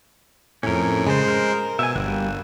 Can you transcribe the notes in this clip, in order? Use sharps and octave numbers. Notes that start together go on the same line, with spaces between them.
F2 A2 C#4 A#4
C#3 G#3 C5
A#4
B2 E5 G#5
G1 G3 A#3 F#4